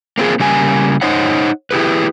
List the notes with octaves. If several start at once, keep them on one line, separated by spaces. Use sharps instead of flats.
A#3 C4 F4 G#4
C#3 G3 A#3 G#5
D#4 C5 C#5 F#5
E4 G4 G#4 B4